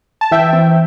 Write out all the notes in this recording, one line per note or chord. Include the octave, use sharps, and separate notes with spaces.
A5
E3 E5 G5
C4